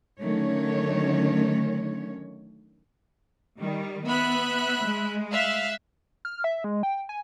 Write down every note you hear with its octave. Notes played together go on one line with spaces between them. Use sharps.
D3 D#3 F#3 A3 C#4 C#5
D#3 G3
B3 E5 B5 F#6
G#3
E5 F5 F#6
F6
E5
G#3
G5
G#5